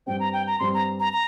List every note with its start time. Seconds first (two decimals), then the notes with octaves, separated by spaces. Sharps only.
0.06 G2 G3 C4 G5
0.20 A#5
0.33 G5
0.47 A#5
0.59 G2 G3 C4 C6
0.74 A#5
1.00 A#5
1.13 A#5